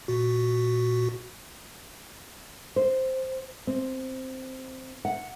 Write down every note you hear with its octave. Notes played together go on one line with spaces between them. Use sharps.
A#2 F#4
C5
C4
F#5